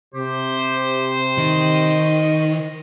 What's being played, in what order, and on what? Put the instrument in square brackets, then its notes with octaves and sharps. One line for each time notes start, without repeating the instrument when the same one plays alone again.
[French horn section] C3 [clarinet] G4 [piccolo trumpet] C5
[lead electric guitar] D#3 [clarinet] D#5